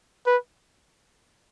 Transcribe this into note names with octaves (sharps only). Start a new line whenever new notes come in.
B4